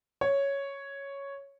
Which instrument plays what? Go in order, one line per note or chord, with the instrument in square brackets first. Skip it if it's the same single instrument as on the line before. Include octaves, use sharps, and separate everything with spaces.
[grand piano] C#5